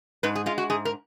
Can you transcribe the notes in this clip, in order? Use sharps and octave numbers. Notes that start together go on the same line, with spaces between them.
G#2 B4
G#4
G#3 F4
F#4
G#2 G#4
A#4